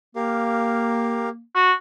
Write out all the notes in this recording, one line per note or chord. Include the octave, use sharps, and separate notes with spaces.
A#3 G4 A#4 F5
F#4